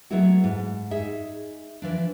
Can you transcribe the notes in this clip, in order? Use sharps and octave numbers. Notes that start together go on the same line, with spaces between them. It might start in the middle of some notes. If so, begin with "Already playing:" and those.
F#3 G#3 A3 B3 E4 F#4
G#2
D#4 G#4 E5
E3 F3 D4